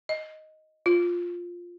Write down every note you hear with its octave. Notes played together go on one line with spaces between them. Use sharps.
D#5
F4